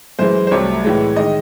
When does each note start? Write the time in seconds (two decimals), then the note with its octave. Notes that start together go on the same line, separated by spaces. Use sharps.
0.19 F#2 E3 G#3 C5
0.47 C5
0.51 C2 C3 F#3 A3 C#5
0.84 A2 E3 G#3
1.16 D#3 G#3 D#5